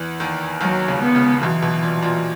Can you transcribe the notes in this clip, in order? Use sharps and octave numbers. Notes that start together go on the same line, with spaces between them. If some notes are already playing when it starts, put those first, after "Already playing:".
Already playing: E2 E3
D#2 D#3
D#2 D#3 F#3
C#2 C#3
B3
C#2 C#3
B1 B2 E3
B1 B2
A#2
A#2